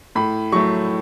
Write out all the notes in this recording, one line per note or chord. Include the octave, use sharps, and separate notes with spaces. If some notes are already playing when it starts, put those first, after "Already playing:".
A2 B5
F#3 A3 C#6